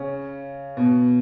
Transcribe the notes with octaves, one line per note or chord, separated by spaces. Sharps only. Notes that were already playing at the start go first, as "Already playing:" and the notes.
Already playing: C#3 C#4
B2